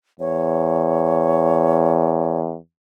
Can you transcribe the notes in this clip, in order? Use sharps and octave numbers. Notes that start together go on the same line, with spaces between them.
E2 C#5